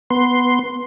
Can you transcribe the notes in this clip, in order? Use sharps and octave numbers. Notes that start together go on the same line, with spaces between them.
B3 C6